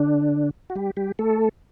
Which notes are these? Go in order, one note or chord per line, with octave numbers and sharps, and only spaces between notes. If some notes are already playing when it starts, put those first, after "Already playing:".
Already playing: D3 D4
F#4
G3 G4
G3 G4
A3 A4